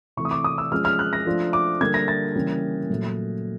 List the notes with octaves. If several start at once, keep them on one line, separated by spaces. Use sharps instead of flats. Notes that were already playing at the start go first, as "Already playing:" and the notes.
C3 E3 A3 C#6
D#6
D6
D#6
E6
F3 G#3 C#4 F4 F6
F6
F#6
A#6
F3 A3 D4 F4
D6
D3 G3 A#3 G#6
A#6
A6
C#3 E3 G3 A#3 C#4
A#2 F#3 A3